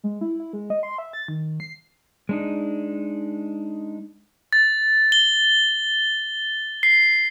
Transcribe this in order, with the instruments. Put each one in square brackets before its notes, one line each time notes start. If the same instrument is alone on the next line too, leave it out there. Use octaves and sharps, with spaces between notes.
[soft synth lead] G#3
E4
E4
G#3
D#5
C6
E5
A6
D#3
C7
[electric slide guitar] G#3 D4 D#4
[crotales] A6
G7
C7